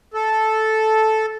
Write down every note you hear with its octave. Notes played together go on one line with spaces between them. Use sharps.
A4